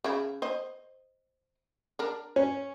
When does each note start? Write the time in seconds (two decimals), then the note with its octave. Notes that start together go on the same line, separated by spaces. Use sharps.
0.04 C#3 E4
0.42 C5 D#5
1.99 D4 A#4
2.36 C#4